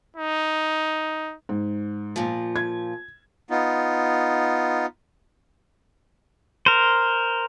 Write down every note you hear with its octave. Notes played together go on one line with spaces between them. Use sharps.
D#4
G#2
A#2 F3
G#6
B3 D#4 F4
A#4 C5